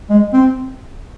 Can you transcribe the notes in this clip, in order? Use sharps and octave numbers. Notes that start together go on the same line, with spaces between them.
G#3
C4